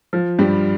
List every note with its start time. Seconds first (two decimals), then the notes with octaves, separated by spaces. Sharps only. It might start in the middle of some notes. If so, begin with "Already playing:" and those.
0.13 F3
0.39 G2 G3